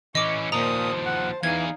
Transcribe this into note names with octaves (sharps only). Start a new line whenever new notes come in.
E3 C#4 D#5 C#6 D6
D#2 A#2 F3 C5 A5 A#5 D#6
F#5
E2 E3 D#4 G#4 F5 G#6